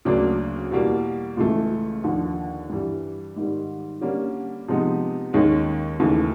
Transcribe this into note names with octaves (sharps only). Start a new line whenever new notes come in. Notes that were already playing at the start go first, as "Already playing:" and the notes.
D2 C#3 F#3 A#3 D4
E2 B2 G3 A#3
C#2 C#3 E3 A3
D#2 D3 F3
G2 E3 G3
G#2 D#3 G3
D3 G3 A#3 C#4
C3 F3 G#3 B3 D#4
D#2 D#3 G#3 C#4
D#2 C#3 E3 A3